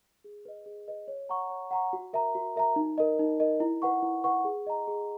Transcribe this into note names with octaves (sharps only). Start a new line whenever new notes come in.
G#4
B4 D#5
G#4
B4 D#5
C#5
F#5 A#5 C#6
C#5
F#5 A#5 C#6
F#4
A#4 E5 A#5
F#4
A#4 E5 A#5
D#4
A#4 D#5
D#4
A#4 D#5
E4
B4 F#5 C#6
E4
B4 F#5 C#6
G#4
D#5 A#5
G#4